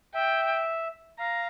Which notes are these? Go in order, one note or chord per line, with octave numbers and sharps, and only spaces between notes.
E5 G5
F5 A#5